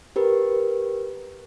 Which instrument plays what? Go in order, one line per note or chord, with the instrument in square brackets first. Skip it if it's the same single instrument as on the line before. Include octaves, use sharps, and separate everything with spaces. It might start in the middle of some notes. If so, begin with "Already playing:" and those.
[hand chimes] G4 A#4 B4